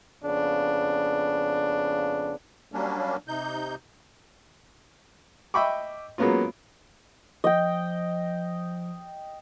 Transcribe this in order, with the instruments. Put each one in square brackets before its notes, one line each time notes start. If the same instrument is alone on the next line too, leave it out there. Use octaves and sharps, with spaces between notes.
[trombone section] F2 C#3 B3 D4
[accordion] F#3 G3 A#3 C#4 D4
C3 D#4 G6
[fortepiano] D#5 E5 G5 B5 C#6 D6
F#3 G#3 A#3 B3 C#4 F4
[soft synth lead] F3 [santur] D#5 G5